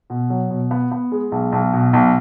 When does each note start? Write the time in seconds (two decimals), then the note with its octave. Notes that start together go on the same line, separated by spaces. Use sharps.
0.10 B2
0.30 F#3
0.50 B2
0.71 B3
0.91 B3
1.12 G#3
1.32 B1
1.52 B1
1.73 B2
1.93 B1